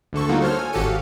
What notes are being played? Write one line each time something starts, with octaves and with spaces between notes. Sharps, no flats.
D2 D3 A4 C#6
G3 A#3 D#4 F4 F#4
A4 C5 C#5 F6
G#5
G#1 F#4 G4 A4 C#7 D#7
F5